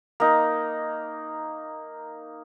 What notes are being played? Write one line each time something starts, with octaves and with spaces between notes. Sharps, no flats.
A#3 D#4